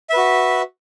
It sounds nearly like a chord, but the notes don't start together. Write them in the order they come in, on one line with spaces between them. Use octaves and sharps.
E5 B4 F#4